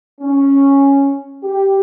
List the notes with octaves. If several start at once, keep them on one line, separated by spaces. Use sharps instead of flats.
C#4
G4